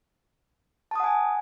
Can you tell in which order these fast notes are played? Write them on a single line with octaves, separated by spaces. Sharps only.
A5 D#6 F#5 G#5